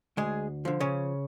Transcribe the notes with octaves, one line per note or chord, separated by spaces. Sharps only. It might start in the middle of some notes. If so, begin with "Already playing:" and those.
D2 G#3 G#4
D3 F3
C#3 C#4